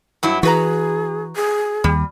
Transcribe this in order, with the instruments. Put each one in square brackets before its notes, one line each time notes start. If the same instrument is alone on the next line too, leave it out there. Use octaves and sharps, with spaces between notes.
[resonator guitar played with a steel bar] G2 F#3 E4
[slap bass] E3 [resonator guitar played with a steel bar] F#4 B4 A#5 [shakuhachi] G#4
[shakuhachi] G#4
[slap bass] D#2 [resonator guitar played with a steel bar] G3